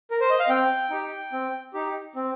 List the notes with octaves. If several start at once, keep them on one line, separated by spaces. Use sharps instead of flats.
A#4
C5
D#5
F5
C4 G5
D#4 G4
C4
D#4 G4
C4